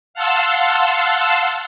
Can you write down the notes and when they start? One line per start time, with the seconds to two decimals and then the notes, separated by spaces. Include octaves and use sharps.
0.14 F5 F#5 A5 C6 E6